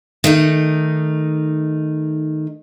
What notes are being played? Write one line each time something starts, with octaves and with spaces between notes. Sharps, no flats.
D#3 A3 D#4